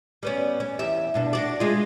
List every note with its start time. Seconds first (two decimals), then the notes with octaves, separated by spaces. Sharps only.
0.23 G3 B3 C#4
0.60 C#4
0.79 E2 G4 E5
1.14 G2 B2 D4
1.33 D4 F#4 D5
1.60 G#3 F4